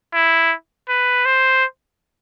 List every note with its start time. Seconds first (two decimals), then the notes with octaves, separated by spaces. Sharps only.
0.14 E4
0.89 B4
1.26 C5